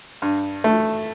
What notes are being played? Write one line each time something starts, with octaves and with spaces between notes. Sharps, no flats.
G2
A3